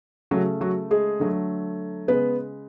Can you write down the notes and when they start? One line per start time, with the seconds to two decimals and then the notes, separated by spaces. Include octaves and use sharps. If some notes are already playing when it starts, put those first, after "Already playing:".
0.31 C#3 F#3 A3 F#4
0.61 F#3 F#4
0.91 G#3 G#4
1.20 D3 F#3 A3
2.08 C#3 G#3 B3 B4